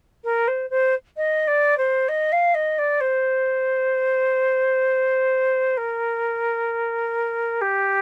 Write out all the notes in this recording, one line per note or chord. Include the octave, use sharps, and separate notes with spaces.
A#4
C5
C5
D#5
D5
C5
D#5
F5
D#5
D5
C5
A#4
G4